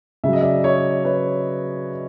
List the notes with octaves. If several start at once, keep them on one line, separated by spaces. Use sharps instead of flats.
C#3 F#3 D#5 E5
D5 E5
C#5 D#5
B4 C#5